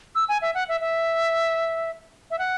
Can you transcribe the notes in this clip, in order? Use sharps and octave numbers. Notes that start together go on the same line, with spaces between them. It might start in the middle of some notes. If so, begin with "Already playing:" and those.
E6
G#5
E5
F#5
E5
E5
E5
F#5